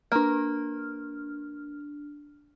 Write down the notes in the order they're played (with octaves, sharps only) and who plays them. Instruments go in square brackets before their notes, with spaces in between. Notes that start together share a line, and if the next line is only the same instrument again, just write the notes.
[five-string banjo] A#3 [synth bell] D4 F6